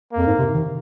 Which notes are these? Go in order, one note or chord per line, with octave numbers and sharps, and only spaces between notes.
A#3
F2
G#2
C3
D#3